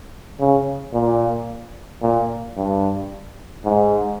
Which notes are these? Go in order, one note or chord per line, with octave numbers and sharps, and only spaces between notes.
C#3
A#2
A#2
G2
G#2